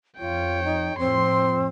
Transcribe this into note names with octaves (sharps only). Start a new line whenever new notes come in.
F2 F4 C#5 G5
D#4
F2 A2 F3 C4 C6